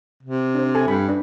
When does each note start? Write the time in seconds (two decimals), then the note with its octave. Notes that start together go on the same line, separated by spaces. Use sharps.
0.23 C3
0.55 D4 C5
0.75 A4 G#5
0.88 G2 B5
1.09 D4 B4